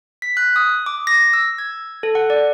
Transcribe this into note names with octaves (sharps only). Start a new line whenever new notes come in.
B6
F#6
D#6
D6
A#6
E6
G#6
A4
F#5
D5